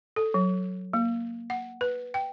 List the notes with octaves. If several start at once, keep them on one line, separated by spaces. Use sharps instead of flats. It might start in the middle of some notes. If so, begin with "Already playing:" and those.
A4
F#3
A#3
F#5
B4
G5